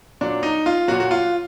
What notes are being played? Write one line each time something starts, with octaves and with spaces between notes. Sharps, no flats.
A#2 F#3 D4
D#4
F4
A#2 F#3 F#4
F#4
F4